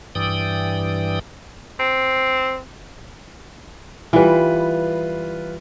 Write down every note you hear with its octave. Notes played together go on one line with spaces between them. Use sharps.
G2 E3 D5 G5 D#6
C4
E3 G3 F4 B4